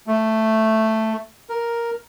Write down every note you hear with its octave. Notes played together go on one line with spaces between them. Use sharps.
A3
A#4